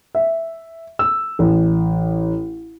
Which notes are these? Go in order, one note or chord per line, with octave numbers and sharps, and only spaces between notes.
E5
E6
A1